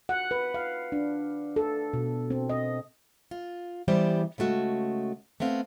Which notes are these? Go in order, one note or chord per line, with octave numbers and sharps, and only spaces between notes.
F#5
B4
F5
D4
A4
B2
C4
D#5
F4
E3 G3 B3 G4 C5 D5
C#3 G#3 A3 F#4
A3 B3 C4 F5